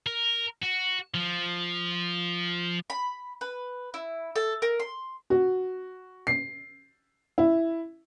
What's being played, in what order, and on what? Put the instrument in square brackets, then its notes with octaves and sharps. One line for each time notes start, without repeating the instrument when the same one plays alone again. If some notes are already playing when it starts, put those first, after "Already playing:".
[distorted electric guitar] A#4
F#4
F3
[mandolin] B5
B4
E4
A4
A#4
C6
[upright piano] F#4
C7
E4